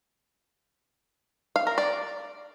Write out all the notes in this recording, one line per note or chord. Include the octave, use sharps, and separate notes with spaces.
F5
A#4
D5